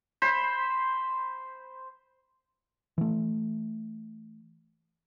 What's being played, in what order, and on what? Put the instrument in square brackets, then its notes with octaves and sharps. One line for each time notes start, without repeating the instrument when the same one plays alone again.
[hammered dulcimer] C5 B5
[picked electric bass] E3 A3